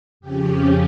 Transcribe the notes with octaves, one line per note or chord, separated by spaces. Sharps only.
F2 C#3 F3 C#4 G4